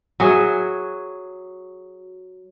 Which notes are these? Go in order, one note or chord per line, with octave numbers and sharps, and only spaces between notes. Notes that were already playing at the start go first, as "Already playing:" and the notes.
F#3 F#4 G#4 E5